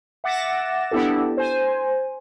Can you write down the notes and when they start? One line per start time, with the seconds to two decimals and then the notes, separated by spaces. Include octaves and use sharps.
0.24 E5 F#5 D6 A6 A#6 E7
0.91 B3 D4 E4 G4 A4
1.37 C5 G#5